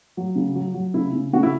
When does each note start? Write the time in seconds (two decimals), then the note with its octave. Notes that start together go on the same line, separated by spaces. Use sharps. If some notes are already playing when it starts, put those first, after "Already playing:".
0.17 F#3
0.35 C#3
0.55 F#3
0.74 F#3
0.94 C#3 E4
1.13 C#3
1.33 C#3 F#4
1.43 E4